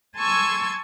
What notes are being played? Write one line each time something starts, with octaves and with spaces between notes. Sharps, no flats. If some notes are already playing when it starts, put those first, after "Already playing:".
G#5 A5 C6 C#6 E6 G#6